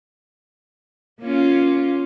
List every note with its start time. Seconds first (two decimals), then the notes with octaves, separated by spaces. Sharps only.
1.21 A#3 C#4 F4